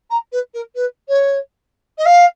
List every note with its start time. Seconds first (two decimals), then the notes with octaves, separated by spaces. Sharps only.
0.10 A#5
0.32 B4
0.53 A#4
0.75 B4
1.08 C#5
1.98 D#5
2.05 F5